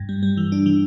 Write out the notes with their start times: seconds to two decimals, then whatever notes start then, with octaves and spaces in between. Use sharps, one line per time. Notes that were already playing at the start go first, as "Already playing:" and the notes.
Already playing: G2
0.09 G3
0.23 G3
0.37 E3
0.52 D4
0.66 E3